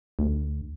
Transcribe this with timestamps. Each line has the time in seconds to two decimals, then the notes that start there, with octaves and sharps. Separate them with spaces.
0.19 D2